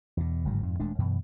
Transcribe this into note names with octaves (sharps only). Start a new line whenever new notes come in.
E2 B2
G1 G#2 C#3 F#3
F2 G#2
D#1 G#3 A3 D4
F#2 B2 E3